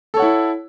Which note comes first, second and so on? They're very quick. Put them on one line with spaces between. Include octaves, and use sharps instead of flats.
A4 C#5 F#5 E4